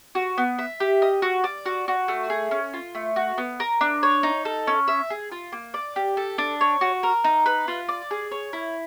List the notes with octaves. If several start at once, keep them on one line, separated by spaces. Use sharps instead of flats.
F#4
B3
E5
G4
D#5
F#4
D5
F#4
F#4
A3
G#4
C#4
F4
A3
F#4
B3
A#4
D4
C#5
D#4
A4
C#4
E5
G#4
F4
A#3
D5
G4
A4
D4
C#5
F#4
A#4
D#4
B4
F4
D5
G#4
C#5
E4